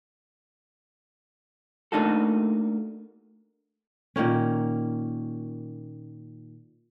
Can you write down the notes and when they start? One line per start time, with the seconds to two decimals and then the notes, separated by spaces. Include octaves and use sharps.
1.92 A3 A#3 D4 D#4 F#4 A4
4.16 A#2 D#3 A#3 C#4